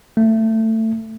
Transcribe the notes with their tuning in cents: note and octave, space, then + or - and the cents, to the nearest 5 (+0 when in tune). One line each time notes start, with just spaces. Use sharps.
A3 +20